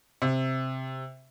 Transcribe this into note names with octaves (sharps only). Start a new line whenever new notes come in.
C3